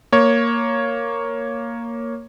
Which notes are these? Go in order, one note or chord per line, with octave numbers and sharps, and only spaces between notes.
A#3 C#5